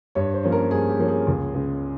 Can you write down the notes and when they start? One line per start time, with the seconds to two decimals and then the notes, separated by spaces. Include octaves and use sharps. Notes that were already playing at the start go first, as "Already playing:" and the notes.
0.15 G2 C#5
0.34 C5
0.43 F3 A#3 C#4
0.52 A#4
0.71 G2 G#4
0.89 G4
0.99 F3 A#3 C#4
1.09 G#4
1.27 C#2
1.54 C#3 G#3